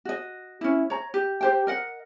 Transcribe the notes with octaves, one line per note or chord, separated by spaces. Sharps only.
F#4 D#5
C#4 E4
C#5 A#5
G4
G4 C5 G5
A#4 D#5 F#5